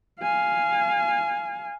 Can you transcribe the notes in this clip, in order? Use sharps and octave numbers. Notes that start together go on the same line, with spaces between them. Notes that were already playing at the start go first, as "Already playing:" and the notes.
F5 G#5